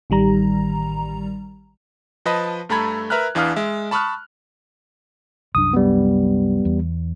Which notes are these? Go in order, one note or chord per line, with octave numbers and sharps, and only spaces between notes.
A1 D#3 G3 A#5
F3 B4 D#5 A5 B5
G2 A3 A4 A#5 B5 G#6
A#4 B4 E5 A#5 F6 F#6
E2 E3 D4 F5 D#6 F6
G#3 E5
A5 B5 C#6 D#6 F6 F#6
C2 F#2 D4 D#6
G3 B3
E2